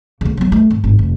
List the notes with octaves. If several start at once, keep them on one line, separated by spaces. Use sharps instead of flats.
D2 C#3
F#3 B3
A3
G#1
G#1
F1